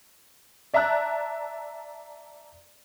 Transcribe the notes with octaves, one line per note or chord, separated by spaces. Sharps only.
D5 E5 A5 A#5 E6 F#6